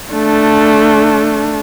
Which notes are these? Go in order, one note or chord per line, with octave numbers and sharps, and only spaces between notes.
A3 D4